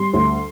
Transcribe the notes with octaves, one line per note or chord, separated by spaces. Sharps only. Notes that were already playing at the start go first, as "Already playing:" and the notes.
Already playing: G3 C6
D2